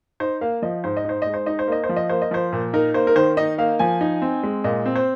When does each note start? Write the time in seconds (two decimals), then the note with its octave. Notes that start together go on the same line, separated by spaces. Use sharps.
0.20 D#4 C5
0.41 A#3 F5
0.62 F3 D#5
0.84 G#2 C5
0.97 D#5
1.05 D#4 C5
1.22 G#3 D#5
1.34 C5
1.46 D#4 D#5
1.59 C5
1.68 A#3 D#5
1.84 C5
1.89 F3
1.96 D#5
2.09 A#3 C5
2.22 D#5
2.31 F3 C5
2.53 A#2
2.73 D#4 A#4
2.94 A#3 C5
3.07 A#4
3.16 D#3 C5
3.37 D#4 D#5
3.58 A#3 F5
3.79 F3 G#5
4.01 D#4
4.22 C4
4.43 G#3
4.64 A#2 D#5
4.86 C4
4.96 C5